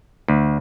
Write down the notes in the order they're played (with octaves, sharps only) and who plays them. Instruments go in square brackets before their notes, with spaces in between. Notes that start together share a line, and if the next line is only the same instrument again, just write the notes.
[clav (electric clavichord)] D2